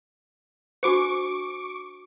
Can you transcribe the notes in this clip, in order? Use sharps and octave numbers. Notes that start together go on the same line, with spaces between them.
D4 F#4 C5 C#6 D6 D7